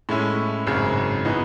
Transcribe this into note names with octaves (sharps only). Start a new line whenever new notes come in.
A2 G#3 C#4 E4
G#1 F#2 C#3
E3 B3 D#4